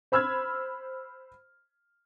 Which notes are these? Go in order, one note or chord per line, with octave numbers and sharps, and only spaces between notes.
C5 B5 E6 F6 G#6